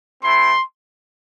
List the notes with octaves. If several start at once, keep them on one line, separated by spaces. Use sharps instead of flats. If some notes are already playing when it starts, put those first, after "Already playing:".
A3 C4 E4 C6